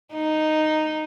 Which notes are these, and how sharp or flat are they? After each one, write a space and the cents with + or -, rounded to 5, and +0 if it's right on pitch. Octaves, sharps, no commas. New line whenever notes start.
D#4 -5